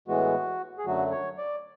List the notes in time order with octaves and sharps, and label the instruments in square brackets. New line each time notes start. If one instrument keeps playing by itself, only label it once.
[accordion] A2 E3 G#3 B3 F#4
G#4
F#2 D3 F#3 A3 F#4
C#5
D5